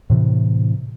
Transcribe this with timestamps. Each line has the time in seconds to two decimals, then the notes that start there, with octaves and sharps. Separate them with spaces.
0.10 A2 C3 E3